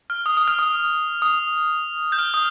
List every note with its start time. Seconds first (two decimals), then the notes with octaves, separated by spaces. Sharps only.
0.10 F6
0.26 D#6
0.37 D#6
0.48 F6
0.59 D#6
1.22 D#6
2.12 G6
2.19 F6
2.34 D#6